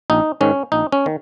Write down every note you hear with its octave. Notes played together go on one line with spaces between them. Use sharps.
A#1 D#4
G#2 D#3 C#4
A#1 D#4
C#4
D#3